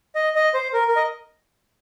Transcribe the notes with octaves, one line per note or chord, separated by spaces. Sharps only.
D#5
D#5
C5
A#4
A#4
D#5